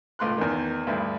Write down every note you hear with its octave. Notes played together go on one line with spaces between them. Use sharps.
C#2 A2 C6 F#6
E2 D#3
D2 G2 E4